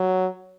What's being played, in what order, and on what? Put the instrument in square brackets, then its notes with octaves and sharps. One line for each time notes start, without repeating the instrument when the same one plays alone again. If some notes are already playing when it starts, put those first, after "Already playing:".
Already playing: [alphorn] F#3